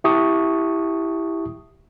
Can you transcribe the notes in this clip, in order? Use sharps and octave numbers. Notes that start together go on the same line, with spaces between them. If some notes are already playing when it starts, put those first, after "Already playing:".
E4 G4 E5 A5 C#6 D#6